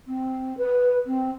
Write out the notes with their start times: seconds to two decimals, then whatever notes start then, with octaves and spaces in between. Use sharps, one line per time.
0.07 C4
0.58 B4
1.06 C4